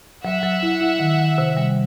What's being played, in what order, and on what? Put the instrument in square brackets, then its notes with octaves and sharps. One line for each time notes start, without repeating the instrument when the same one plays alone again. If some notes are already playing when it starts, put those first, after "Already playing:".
[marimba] F#3 [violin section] E5 F#5
[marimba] F#3
E4
E4
D#3
D#3
C3
G3